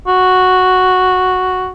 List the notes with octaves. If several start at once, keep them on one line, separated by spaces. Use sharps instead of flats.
F#4